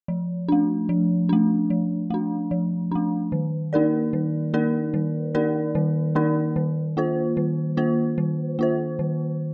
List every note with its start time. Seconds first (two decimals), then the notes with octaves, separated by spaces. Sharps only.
0.08 F3
0.48 A3 D4
0.89 F3
1.29 A3 D4
1.70 F3
2.10 A3 D4
2.51 F3
2.91 A3 D4
3.32 D#3
3.73 A#3 D#4 A#4 D5
4.13 D#3
4.54 A#3 D#4 A#4 D5
4.94 D#3
5.35 A#3 D#4 A#4 D5
5.75 D#3
6.15 A#3 D#4 A#4 D5
6.56 D#3
6.97 A#3 F4 C5
7.37 D#3
7.77 A#3 F4 C5
8.18 D#3
8.59 A#3 F4 C5
8.99 D#3